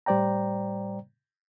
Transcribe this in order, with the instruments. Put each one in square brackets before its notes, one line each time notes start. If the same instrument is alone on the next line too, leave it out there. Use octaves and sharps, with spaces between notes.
[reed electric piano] A2 G3 C5 D5 G5 A#5